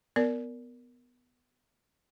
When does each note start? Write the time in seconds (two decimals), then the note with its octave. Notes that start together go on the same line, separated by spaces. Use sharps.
0.16 B3 A#4 D5